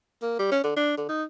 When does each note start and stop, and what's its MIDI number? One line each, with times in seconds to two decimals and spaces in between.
0.22 0.34 58
0.39 0.50 55
0.52 0.60 61
0.64 0.75 50
0.76 0.96 62
0.97 1.04 50
1.09 1.24 63